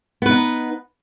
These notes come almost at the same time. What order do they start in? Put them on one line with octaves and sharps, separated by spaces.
B3 B4 D#4